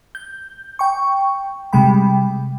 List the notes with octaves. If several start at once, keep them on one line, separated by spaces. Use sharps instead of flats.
G6
G5 C#6
C3 G3 G#3 G5 B5